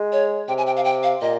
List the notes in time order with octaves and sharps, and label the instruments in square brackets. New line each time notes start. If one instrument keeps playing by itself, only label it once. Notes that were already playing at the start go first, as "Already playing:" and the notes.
Already playing: [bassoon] G#3
[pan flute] C#5
[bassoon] C3 [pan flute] G5
[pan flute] G#5
G5
F5
G5
F5
[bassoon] A#2 [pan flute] D#5